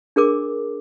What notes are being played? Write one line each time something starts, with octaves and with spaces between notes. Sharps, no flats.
D4 G#4 A#4 D6